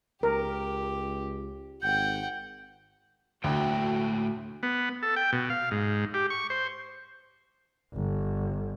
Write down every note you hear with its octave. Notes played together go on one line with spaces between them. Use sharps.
C#2 G4 A#4
G#1 F#5 G5 G6
D2 A2 A3 F#4 G5
B3
A4
G5
B2
F5
G#2
G4
C#6
C5
G1